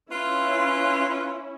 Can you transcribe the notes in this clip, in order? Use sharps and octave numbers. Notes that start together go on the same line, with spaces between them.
C#4 E4 F4 B4